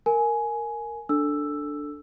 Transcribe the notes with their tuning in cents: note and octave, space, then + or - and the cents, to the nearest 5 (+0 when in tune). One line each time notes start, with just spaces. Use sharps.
A#4 -10 G#5 +15
D4 +0 A4 +0 E6 +5